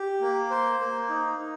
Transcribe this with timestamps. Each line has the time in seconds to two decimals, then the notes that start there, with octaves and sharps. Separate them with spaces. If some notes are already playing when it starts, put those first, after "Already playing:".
Already playing: G4
0.21 A#3
0.50 C5
0.79 A#3
1.09 D#4
1.39 D#4